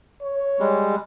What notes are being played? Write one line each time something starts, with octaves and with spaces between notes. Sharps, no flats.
C#5
G3 G#3